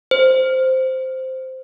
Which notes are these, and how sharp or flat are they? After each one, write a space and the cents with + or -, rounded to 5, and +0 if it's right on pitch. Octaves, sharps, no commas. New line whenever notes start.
C5 -5